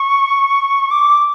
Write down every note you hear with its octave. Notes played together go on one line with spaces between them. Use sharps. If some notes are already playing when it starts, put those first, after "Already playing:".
Already playing: C#6
D6